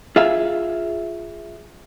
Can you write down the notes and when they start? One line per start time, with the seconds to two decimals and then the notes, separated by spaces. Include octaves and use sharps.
0.16 F4 G#4 E5 F5